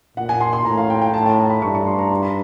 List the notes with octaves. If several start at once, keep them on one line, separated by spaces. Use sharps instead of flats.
A#2 F#5
G#5
C6
C6
A2 A#5
F5
G5
G5
A2 A5
A5
A#5
B5
G2 C#6
C#6
C6
A#5
C6
B5